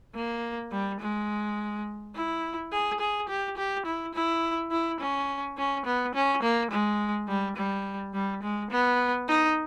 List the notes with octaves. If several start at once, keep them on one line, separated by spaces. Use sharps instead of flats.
A#3
G3
G#3
E4
G#4
G#4
G4
G4
E4
E4
E4
C#4
C#4
B3
C#4
A#3
G#3
G3
G3
G3
G#3
B3
D#4